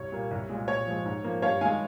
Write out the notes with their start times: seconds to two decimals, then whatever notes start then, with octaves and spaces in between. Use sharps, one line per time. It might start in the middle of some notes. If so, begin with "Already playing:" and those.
Already playing: C2 C#5
0.12 A#2 G3 A#3
0.31 C2
0.50 A#2 G#3
0.68 A#2 C#5
0.86 F3 G#3
1.05 G#2
1.24 F3 A#3
1.42 G2 C#5 F5
1.61 D#3 G#3 F5 G#5